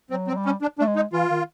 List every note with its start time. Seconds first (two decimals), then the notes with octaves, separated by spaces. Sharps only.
0.10 F#3 C4
0.28 C4
0.32 F#3
0.37 G3
0.45 C#4
0.62 D4
0.79 A3 D4
0.87 G#3
0.96 D#4
1.12 E3 F4
1.30 D#3